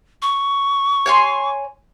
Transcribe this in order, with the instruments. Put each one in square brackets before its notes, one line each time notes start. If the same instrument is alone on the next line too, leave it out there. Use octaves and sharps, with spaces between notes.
[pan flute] C#6
[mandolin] C#5 G#5 C6